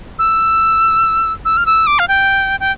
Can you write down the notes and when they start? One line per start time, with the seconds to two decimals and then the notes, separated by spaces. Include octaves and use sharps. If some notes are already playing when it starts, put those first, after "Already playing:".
0.19 E6
1.45 E6
1.57 F6
1.66 E6
1.87 D6
1.99 F5
2.08 G5
2.60 G5